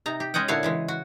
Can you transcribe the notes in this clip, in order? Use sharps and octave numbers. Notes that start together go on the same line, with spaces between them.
C3 D#4 A#5
G4
G#3 C#4 D#5 F#5 G5
A#2 D3 E4 F#4 C#5 F5
C#3 E3 G#3
F#4